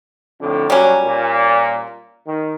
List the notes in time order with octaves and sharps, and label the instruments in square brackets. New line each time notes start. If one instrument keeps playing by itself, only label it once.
[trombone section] F2 A2 D3
[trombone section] A#2 F#3 [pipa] G3 C#4
[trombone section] A#2
D#3